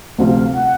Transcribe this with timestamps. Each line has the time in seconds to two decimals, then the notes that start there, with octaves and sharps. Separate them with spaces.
0.18 D2 C3 F3 F5 F#5
0.54 F#5